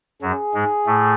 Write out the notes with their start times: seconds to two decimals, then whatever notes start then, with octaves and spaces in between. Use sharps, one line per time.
0.22 F#2 F#3 G#4
0.54 G#2 G#3
0.86 A2 A3